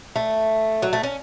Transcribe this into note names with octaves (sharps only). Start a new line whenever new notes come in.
A3
F#3
A3
C#4